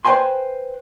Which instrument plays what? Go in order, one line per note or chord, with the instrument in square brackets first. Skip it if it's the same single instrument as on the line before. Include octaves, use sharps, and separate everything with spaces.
[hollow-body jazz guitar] B4 C5 D5 G5 G#5 C6